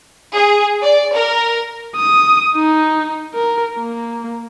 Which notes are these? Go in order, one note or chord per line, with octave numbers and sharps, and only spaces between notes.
G#4
D5
A#4
D#6
D#4
A#4
A#3